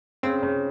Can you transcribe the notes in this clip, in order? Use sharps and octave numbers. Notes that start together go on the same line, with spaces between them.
C#3 C4
C#3